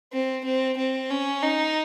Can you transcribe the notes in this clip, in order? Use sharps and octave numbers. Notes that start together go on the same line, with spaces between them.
C4
C4
C4
C#4
D#4